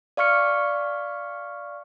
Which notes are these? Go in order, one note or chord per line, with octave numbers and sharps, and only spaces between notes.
D5 F5 C#6 F6 C#7